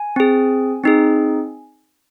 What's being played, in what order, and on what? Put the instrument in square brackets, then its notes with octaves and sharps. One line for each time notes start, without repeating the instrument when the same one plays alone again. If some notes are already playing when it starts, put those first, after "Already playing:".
Already playing: [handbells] G#5
C4 G#4
C4 D#4 G#4